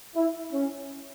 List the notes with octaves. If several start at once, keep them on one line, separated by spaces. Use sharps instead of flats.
E4
C#4